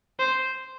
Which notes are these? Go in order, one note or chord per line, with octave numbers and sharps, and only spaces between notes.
C5